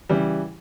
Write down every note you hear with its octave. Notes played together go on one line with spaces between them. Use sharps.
C#3 E3 G3